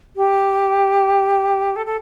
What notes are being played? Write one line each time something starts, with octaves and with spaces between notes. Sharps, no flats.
G4
A4
A4